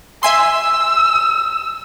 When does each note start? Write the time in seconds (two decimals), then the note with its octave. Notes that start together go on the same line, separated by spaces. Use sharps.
0.23 E5 G#5 C6 E6